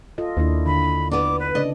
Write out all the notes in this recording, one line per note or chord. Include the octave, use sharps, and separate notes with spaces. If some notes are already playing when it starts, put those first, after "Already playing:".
F4 A4 D#5
D#2 A#3 D4 E4
D3 B5
B3 D4 D6
B4
C#3 D4 D5 D#5